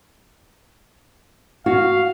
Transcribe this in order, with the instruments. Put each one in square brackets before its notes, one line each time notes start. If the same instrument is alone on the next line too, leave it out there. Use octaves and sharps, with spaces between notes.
[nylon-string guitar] F#4 [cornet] F5